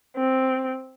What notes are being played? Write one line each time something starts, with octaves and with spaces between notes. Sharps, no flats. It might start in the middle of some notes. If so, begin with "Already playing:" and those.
C4